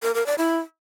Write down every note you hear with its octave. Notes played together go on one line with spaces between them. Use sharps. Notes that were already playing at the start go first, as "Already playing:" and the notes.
A#4
A#4
D5
E4